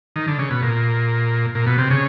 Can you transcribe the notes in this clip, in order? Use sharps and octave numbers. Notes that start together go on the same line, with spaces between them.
D#3
D3
C#3
B2
A#2
A#2
B2
C3
C#3